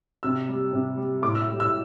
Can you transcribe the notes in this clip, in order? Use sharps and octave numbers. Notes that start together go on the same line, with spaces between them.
C3 E6
G3
C3
G3
A2 D6
E6
G3
E6